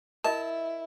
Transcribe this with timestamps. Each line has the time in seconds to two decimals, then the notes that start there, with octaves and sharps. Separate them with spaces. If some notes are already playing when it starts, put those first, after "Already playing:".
0.24 E4 A#4 D#5 E5 A5